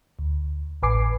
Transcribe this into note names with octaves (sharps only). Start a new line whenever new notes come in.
D2
A1 B4 G#5 D6 C7